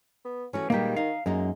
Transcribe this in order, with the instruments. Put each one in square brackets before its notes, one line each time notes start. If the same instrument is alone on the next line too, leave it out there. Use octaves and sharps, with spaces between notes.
[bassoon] B3
[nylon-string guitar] E3 A3 F#4 [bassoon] C#4
[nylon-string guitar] A#2 G3 G#3 [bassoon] D#3 [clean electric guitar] A#3 G4
[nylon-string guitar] D#4 [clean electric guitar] F5
[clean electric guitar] F#2 [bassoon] G#3 [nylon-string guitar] A#3 D#4